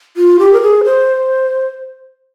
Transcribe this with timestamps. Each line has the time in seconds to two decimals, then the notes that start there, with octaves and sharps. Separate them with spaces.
0.17 F4
0.39 G4
0.53 A#4
0.62 G#4
0.84 C5